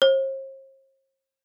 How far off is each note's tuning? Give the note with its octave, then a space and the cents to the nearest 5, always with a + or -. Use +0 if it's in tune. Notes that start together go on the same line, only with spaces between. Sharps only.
C5 +45